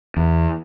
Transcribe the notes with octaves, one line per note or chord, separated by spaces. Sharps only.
E2